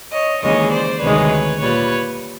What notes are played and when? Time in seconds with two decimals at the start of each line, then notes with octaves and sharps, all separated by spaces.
0.12 C#5 D#5
0.42 D#2 C#3 E3 G#3 C#5 D#5
0.71 C5 D5
1.01 D2 C3 D#3 G#3 B4 C#5
1.60 A#2 G3 B4 C#5